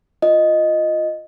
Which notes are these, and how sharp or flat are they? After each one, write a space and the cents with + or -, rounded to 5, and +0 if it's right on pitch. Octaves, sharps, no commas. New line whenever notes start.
F4 +0 D#5 +0